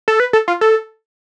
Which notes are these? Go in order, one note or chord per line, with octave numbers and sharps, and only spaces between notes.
A4
B4
A4
F4
A4